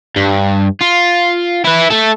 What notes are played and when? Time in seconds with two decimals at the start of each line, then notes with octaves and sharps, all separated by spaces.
0.16 G2
0.81 F4
1.65 E4 B4
1.90 A3 A4